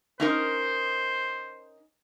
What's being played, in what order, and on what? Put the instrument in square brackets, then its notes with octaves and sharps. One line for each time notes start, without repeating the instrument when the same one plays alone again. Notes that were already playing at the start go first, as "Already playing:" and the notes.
[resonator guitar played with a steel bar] C#4 D#4 A#4 [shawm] C5